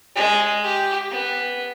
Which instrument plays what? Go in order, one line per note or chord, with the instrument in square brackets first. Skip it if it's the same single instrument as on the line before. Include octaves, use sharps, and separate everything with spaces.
[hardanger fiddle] G#3
G4
B3